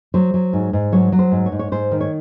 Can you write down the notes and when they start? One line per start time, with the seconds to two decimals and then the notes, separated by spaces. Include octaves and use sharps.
0.14 F#3 C5
0.34 F#3
0.53 G#2
0.73 G#2
0.92 F#3 C#5
1.12 F#3
1.19 C5
1.32 G#2
1.46 C#5
1.52 G#2
1.59 C#5
1.72 G#2 C5
1.91 D#3
2.01 C#5